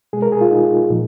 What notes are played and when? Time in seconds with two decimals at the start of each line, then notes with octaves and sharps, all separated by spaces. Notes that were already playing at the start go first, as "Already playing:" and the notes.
0.13 B2 G#3 G#4
0.22 A#4
0.32 G#4
0.41 F4
0.51 D#4
0.90 A#2 F3